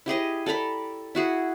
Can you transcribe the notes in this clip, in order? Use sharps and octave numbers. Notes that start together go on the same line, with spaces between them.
E4 G4 G#4 D#5
A4 D5 A#5 B5
E4 F#4 G#4